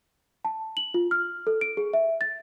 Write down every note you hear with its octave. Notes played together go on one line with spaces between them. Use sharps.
A5
F#7
F4
F6
A4
D7
G#4
E5
A6